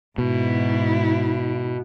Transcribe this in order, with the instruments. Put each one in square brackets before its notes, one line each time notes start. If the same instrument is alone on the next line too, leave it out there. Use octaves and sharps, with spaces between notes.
[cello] G#2 E4 [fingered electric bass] B2